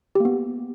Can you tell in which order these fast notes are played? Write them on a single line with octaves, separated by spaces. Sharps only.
G4 A#3 B3